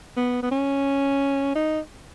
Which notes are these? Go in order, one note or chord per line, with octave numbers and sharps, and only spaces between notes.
B3
B3
C#4
D#4